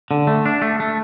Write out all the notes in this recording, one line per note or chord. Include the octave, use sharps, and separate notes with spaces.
D3
A3
D4
A3
A3